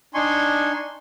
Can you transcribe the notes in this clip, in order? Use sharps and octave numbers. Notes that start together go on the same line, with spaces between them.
D4 D#4 G#5 C6 C#6